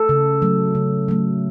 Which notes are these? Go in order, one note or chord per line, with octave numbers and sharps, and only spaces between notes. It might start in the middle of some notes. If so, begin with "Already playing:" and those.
Already playing: A4
C#3
F#3 A3
C#3
F#3 A3